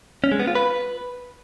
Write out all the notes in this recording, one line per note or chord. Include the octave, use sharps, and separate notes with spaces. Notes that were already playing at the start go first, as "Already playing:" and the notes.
C#4
G#3
B3
F4
B4